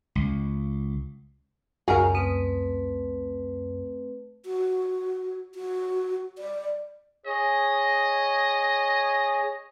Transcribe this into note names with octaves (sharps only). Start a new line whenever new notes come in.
C#2
C#2 F#2 C#4 D#4 F#4 G#4 A#4 F5
A3 C4 B4 D#6
F#4
F#4
D5
G#4 C#5 D#5